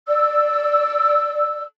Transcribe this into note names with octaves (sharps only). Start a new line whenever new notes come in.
D5 E6